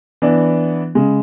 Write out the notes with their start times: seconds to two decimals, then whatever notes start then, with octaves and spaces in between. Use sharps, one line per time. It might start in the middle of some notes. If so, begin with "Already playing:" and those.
0.22 E3 B3 D4
0.95 C#3 G#3